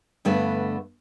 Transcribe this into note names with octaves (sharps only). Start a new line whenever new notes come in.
G2 D3 A3 B3 B4